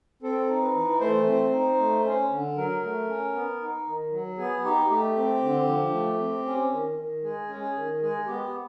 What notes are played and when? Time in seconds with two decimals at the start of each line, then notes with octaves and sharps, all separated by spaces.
0.23 C4 A4
0.49 D#4
0.62 B4
0.75 E3
1.00 A3 C5
1.27 C4
1.53 D#4
1.79 A3
2.04 C#4
2.31 D3
2.57 F#3 A#4
2.83 A3
3.09 C#4
3.34 B3
3.61 D#4
3.86 D#3
4.12 F#3
4.38 B3 G#4
4.65 D#4 G4
4.90 A3 G4
5.17 C4
5.42 D3
5.68 F3
5.93 A3
6.19 C4
6.46 C#4
6.72 D#3
6.98 D#3
7.23 G#3 G#4
7.49 C#4
7.62 G#4
7.76 D#3
8.02 G#3 G#4
8.27 B3 G4